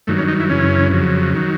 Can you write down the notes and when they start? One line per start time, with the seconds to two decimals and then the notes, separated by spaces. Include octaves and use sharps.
0.07 G2 D#3 F#3 A3
0.18 C#4
0.28 D#4
0.40 E4
0.49 F#2 C#3 E3 C#4
0.91 F2 C#3 F#3
1.34 D#3 F#3